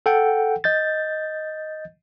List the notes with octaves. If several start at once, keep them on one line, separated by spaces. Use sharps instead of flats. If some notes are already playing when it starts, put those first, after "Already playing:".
A4 F#5 G5
D#5 G6 A6